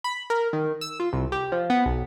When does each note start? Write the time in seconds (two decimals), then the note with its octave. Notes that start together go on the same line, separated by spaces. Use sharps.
0.04 B5
0.30 A#4
0.53 D#3
0.81 E6
1.00 F4
1.13 C2
1.32 G4
1.52 F3
1.70 B3
1.86 B1